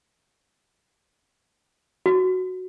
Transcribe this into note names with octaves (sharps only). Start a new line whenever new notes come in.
F#4